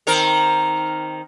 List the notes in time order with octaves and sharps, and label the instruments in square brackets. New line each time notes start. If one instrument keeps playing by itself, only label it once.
[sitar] D#3 C4 A#4